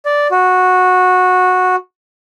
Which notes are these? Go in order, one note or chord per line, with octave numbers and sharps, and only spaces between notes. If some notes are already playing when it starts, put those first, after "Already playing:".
D5
F#4